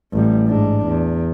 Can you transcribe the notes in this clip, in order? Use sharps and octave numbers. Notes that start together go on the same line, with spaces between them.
A1 G3
G#2 D4
E2